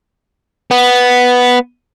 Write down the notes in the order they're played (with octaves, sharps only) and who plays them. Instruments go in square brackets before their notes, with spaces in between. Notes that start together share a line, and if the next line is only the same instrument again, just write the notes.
[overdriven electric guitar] B3